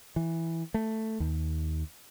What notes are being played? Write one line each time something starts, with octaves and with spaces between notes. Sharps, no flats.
E3
A3
D#2